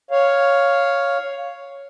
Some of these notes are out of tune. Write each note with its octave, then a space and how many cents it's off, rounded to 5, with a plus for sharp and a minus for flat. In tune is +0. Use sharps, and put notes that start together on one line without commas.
C#5 +5 F5 +0